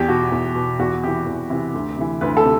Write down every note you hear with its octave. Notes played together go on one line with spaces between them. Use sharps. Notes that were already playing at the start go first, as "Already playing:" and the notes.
Already playing: E2 G4
B2 F#4
E2
B2
E2 F#4
C3 E3 G4
E2
C3 E3
D2
C3 E3
D2 B4
A4
C3